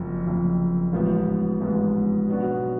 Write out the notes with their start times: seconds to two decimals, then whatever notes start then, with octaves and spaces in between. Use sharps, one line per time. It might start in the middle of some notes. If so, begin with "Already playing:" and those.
Already playing: F#1 F2 F3
0.26 F#1 F2 F3
0.93 A1 G#2 F3 B3
1.60 A1 G#2 F3 B3
2.28 B2 F#3 B3 D4 F#4